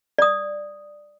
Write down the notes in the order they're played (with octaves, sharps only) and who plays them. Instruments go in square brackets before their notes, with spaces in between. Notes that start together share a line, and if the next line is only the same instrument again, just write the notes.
[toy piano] D5 D#6